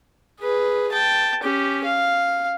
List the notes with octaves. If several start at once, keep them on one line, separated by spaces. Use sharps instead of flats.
G#4 B4
G5 A5
C#4 G4
F5